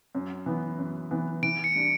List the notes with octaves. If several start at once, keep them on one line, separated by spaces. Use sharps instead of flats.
F#2
E3 B3
F#2
E3 B3
E3 D7
C#7
G3 D4